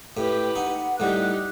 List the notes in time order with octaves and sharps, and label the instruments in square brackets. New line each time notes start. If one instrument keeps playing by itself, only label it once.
[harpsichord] A2 [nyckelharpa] G4 B4 [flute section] G5
[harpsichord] D#4 [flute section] F#5
[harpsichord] A2 G3 [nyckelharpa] D#4 G4 [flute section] F#5 F#6